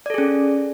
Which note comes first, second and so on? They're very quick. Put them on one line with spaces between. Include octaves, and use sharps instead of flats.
D5 A4 G#4 C#4